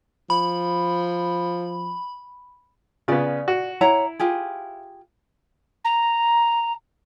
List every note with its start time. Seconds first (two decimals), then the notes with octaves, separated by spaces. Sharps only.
0.30 F3 B5
3.08 C#3 B3 F4 G#4 D5
3.48 F#4
3.81 E4 C#5 F#5 A#5
4.19 F4 G4 G#4
5.84 A#5